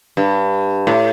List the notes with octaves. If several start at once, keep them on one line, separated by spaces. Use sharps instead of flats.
G2
A2